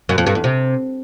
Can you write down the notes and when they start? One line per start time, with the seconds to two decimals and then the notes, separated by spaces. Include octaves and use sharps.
0.09 F#2
0.18 F2
0.27 G2
0.35 E2
0.44 C3